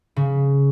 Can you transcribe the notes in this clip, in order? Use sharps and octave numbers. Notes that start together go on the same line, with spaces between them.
C#3